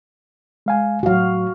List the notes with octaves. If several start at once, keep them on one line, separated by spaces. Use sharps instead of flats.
G#3 F5 G#5
A2 F#3 F#4 F5